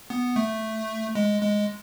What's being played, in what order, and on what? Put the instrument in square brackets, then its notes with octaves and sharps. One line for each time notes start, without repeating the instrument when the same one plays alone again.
[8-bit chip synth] B3
A3
G#3
G#3